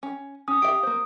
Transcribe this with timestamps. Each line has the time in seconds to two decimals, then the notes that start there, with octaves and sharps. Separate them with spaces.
0.03 C#4
0.48 C#4 D#6
0.62 G4 E5 F5 D7
0.83 A#3 C5